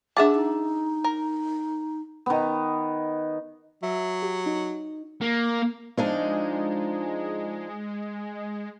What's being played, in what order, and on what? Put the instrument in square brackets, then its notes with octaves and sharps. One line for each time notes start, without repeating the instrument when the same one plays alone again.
[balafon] D4 G#4 D6 [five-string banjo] E5 F#5 A5
[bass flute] D#4
[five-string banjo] A#4
[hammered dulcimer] D#3 B3
[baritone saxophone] F#3 [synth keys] E5
[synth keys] G4
D#4
[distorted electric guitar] A#3
[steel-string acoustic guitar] F3 D4 D#4 [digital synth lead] G#3